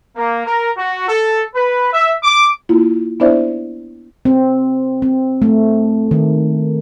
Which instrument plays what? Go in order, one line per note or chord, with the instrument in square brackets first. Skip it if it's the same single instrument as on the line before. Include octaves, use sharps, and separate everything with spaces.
[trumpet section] A#3
A#4
F#4
A4
B4
E5
D6
[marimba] A#3 E4 F4
B3 D4 E4 C5 D5 E5
[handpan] C4
C4
A3
D#3